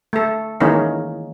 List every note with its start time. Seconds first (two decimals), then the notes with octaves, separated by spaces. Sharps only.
0.13 A3 A4
0.60 D#3 E3 G#3 A#3 C#4 D#4